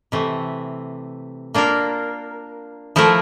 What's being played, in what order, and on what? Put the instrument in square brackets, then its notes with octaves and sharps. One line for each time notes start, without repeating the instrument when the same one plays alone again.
[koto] C3 E3 A3
A#3 D4 F4 A#4
F3 A3 E4 A#4